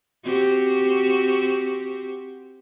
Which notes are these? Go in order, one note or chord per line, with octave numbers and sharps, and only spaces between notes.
C4 F#4 G4